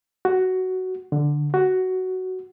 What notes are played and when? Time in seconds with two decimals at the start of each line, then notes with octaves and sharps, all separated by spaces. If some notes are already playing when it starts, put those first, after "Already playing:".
0.25 F#4
1.12 D3
1.54 F#4